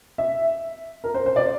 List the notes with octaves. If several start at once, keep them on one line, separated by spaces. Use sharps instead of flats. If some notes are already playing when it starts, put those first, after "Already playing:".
E5
A#4
C5
C5
D5